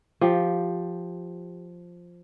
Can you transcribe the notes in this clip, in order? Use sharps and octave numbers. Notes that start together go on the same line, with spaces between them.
F3 G4